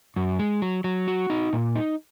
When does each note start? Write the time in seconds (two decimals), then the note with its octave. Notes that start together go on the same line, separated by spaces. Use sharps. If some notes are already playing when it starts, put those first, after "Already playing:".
0.16 F#2
0.39 G#3
0.62 F#3
0.84 F#3
1.08 F#4
1.30 D#4
1.53 A#2
1.76 D#4